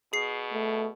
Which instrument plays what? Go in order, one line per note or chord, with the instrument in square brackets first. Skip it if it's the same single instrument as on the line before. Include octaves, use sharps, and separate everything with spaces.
[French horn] B2 [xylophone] G#4 C7
[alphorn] A3